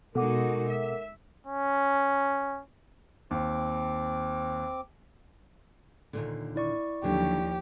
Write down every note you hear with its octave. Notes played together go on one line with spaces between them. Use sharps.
B2 G#3 D#4 F#4 A4 A#4 F#5 D6
E5
C#4
D#2 C4 D6
D#2 A#2 D3
E4 D5 C#6
D#2 D3 F3 F#3 G4